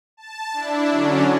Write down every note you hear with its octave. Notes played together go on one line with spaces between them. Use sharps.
A5
D4 E4
D3 F#3 C#4 D4